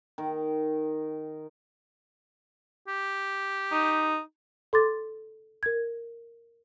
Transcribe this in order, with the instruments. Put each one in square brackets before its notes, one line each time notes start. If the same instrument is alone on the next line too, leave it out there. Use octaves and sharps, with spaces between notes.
[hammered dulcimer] D#3
[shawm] G4
[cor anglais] D#4
[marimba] A4 C6 D6 A6
A#4 G#6